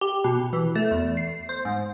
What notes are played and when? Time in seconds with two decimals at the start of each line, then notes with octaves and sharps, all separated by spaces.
0.01 G4
0.24 B2
0.53 E3
0.75 A3
0.91 E2
1.17 C7
1.49 C5
1.65 G#2